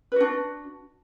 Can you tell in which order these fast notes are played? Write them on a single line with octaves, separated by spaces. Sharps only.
B4 F#4 D4